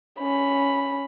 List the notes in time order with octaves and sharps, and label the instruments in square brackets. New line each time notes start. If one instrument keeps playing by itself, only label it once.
[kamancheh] C#4 B5